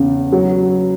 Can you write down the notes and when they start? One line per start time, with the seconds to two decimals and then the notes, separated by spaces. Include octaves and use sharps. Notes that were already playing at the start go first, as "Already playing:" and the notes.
Already playing: E2 C#3
0.32 F#3